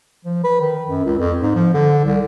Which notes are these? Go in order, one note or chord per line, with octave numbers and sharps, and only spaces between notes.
F3
B4
D#3
F#2
C#2
F2
G#2
F3
D3
C2